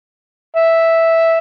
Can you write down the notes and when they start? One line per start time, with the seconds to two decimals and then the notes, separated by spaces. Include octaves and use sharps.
0.56 E5